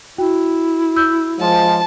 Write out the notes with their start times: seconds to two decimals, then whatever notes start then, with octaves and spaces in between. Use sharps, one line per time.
0.18 E4 F#4 G5
0.96 E6 G6
1.40 F3 G#3 A5